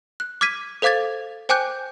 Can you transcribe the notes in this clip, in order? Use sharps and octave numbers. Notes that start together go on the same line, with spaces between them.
F#6
D6 F6 G#6 B6 D#7
A4 C5 F5 D6 G#6 A6
C5 G5 G#5 D6 F#6 G6